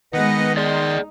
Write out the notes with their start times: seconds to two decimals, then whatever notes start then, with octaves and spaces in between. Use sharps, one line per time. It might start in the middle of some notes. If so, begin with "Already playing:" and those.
0.13 D#3 G#3 B3 B4 D#5 F#5
0.57 D#4 G#4 D5 C6